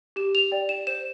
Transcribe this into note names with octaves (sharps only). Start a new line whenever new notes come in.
G4 E7
F7
D5 G5
E7
C5 E7